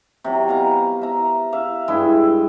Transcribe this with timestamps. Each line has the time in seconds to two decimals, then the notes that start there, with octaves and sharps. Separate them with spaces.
0.24 C3 F#3
0.48 B2 F5 G#5 A#5
1.01 E5 A#5
1.52 E5 F5
1.88 G2 G#3 E4 G5